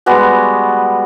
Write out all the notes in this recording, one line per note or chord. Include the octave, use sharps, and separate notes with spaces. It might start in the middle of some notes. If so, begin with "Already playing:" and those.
G3 G#3 B3 F#4